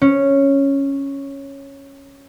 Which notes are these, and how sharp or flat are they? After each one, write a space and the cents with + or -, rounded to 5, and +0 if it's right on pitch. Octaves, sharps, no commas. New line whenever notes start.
C#4 -5